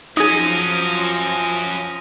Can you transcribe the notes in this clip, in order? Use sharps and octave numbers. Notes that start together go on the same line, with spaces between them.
F3 F#3 C#4 D#4 G#4 D#6 A#6 D#7